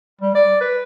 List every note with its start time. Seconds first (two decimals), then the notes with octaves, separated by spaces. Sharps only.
0.21 G3
0.35 D5
0.61 B4